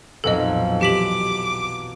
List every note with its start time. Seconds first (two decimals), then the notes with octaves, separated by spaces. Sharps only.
0.24 B1 F2 A#2 A4 D#5
0.81 E3 G4 D6 B6 F#7